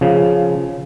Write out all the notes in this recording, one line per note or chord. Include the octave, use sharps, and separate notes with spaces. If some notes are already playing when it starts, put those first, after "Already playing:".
C#3 F3